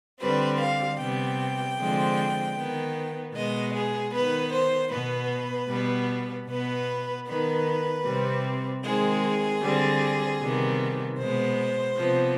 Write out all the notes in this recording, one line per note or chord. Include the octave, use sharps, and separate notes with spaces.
D3 G3 C4 B4
F5
C3 G3 B3 G5
D3 F3 G#3 C4
D#3 B3
B2 G#3 B3 D#5
G#4
D#3 B3 B4
C5
B2 B3 B4
B2 G3 B3
B2 B3 B4
D#3 B3 B4
C3 G3 C4
D#3 G#3 C4 G#4
D3 G3 C4
C3 D#3 G3 B3
B2 G#3 B3 C5
C3 F3 B3